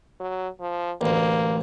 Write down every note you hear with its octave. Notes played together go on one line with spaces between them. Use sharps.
F#3
F3
A1 D2 A#3